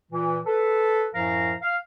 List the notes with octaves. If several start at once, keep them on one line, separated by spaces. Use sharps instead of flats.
A#2 E3
A4 B4
F#2 A2 F3 A#4 F5 A#5
F5